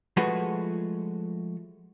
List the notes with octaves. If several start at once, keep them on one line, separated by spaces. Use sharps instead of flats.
F3 G#3 A3 F#4 G#4 B4